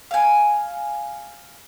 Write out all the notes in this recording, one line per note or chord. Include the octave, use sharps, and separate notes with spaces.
F5 G#5